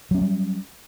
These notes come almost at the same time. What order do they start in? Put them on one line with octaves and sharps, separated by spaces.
F#3 C#4 A#3 G3